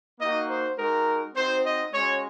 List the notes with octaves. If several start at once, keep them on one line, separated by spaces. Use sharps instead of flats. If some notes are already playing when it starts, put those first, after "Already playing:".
A#3 D#4 F#4 D#5
C5
G#3 D#4 F#4 A#4
C4 D#4 F#4 C5
D#5
G#3 C#4 F#4 C#5